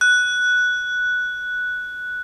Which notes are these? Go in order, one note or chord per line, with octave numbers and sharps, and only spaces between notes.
F#6